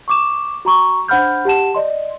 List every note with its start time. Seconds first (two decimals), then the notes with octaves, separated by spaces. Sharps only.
0.08 C#6 D6 E7
0.65 F#4 A#5 C#6
1.08 D4 C5 F#5 B5 F6 G6
1.45 G4 F#5 A5 E7
1.75 D5 D#5 C6